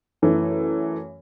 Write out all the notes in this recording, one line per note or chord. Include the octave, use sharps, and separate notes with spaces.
F#2 E3 A3